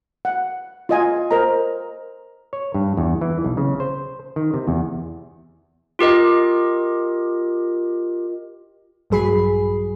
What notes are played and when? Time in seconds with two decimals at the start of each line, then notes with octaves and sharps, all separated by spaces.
0.25 F#5
0.89 F4 D#5 G#5
1.31 A#4 C5 D#5 A#5
2.53 C#5
2.74 G2
2.97 E2
3.21 E3
3.44 B1
3.57 C#3
3.80 C5
4.36 D#3
4.54 C3
4.68 E2
5.99 F4 G4 A#4 D#5
9.10 A#1 G2 F#3 G#4 B5 C7